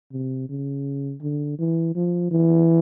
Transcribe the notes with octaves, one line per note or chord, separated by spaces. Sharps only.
C3
C#3
D3
E3
F3
E3